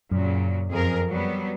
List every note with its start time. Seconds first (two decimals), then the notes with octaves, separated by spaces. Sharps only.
0.12 F#2 A#2 C#3 F#3
0.70 F2 G#4 A#4
1.10 F#3 G3 B3